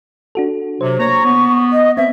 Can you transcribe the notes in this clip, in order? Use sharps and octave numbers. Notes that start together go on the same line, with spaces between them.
D4 F#4 A4
C3 F#3 C5
A#3 C#5 A#5 C#6 A#6
B3
D#5
B3 C4 E5